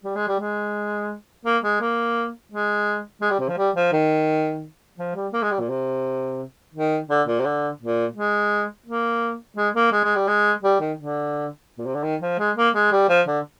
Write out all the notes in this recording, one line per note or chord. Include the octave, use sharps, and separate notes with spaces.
G3
G#3
G3
G#3
A#3
G#3
A#3
G#3
G#3
G3
C3
F3
G3
F3
D#3
F3
G3
A#3
G#3
G3
A#2
C3
D#3
D3
A#2
C3
D3
A#2
G#3
A#3
G#3
A#3
G#3
G#3
G3
G#3
G3
D#3
D3
A#2
C3
D3
D#3
F3
G#3
A#3
G#3
G3
F3
D3